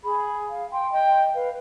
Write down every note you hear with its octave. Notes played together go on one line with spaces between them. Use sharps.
G#4 B5
F5
G5 C6
D#5 G5
B4 F5